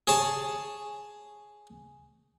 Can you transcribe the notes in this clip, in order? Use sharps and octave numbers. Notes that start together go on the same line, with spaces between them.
G#4 C#5 A5